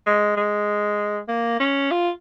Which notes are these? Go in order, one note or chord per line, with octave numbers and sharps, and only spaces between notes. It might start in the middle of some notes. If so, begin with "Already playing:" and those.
G#3
G#3
A#3
C#4
F4